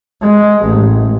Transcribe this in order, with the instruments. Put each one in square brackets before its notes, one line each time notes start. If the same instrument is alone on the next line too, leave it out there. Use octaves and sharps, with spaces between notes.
[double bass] G#3
A1